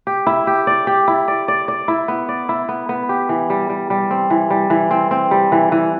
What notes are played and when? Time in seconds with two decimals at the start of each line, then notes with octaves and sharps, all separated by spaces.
0.07 G4
0.27 E4
0.47 G4
0.67 D5
0.87 G4
1.08 E4
1.28 D5
1.48 D5
1.68 D5
1.88 E4
2.08 B3
2.29 D5
2.49 E4
2.69 B3
2.89 B3
3.09 G4
3.29 E3
3.50 G3
3.70 G3
3.90 G3
4.11 C4
4.30 E3
4.50 G3
4.70 E3
4.91 C4
5.11 C4
5.31 G3
5.52 E3
5.72 E3